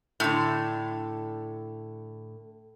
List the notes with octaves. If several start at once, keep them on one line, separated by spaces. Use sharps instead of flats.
A2 D3